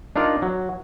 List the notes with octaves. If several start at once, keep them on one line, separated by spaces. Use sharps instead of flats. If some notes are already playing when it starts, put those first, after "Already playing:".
D4 D#4 F4 A#4 D5
F#3